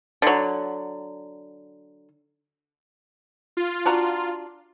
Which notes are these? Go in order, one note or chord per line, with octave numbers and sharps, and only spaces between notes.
D3 F#3
F4
D4 F#4 A#5